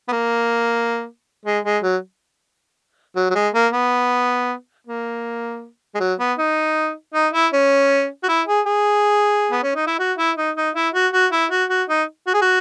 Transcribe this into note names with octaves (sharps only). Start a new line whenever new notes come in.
B3
A#3
G#3
G#3
F#3
F#3
F#3
G#3
A#3
B3
A#3
G#3
F#3
B3
D#4
D#4
E4
C#4
F#4
E4
G#4
G#4
B3
C#4
D#4
E4
F#4
E4
D#4
D#4
E4
F#4
F#4
E4
F#4
F#4
D#4
F#4
G#4
F#4